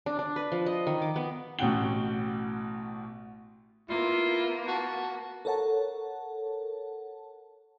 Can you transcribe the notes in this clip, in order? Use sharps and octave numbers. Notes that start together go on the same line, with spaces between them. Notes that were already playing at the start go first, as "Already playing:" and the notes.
D4
D4
B4
F3
D#5
D#3
D6
B3
A1 B2 C#4 F#5 G5 G7
A#3 B3 E4 F4
F#4 A5
A4 A#4 C#5 F#5 A5